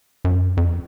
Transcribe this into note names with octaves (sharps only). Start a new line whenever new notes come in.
F#2
F2